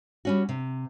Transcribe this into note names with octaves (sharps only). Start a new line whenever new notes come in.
G3 C#4 F#4
C3